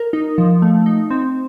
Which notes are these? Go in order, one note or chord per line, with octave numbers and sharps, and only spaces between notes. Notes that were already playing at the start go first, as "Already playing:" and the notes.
Already playing: A#4
D#4
F3
A3
D#4
C4